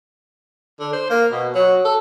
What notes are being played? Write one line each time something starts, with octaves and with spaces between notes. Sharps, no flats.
D3
C5
A#3
B2
F#3
A4